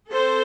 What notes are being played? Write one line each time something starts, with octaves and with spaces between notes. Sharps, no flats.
C4 A4 C5